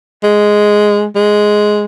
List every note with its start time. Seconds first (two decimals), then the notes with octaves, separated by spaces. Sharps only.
0.24 G#3
1.16 G#3